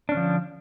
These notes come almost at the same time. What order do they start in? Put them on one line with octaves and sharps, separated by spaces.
D4 C#4 D3 F3